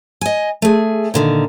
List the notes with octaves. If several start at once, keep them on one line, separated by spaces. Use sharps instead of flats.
D#5 G#5
A3 G#4
A#2 D3 D#3